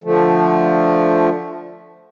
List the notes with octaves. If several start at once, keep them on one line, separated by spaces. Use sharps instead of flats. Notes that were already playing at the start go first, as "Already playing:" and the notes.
D3 F3 A3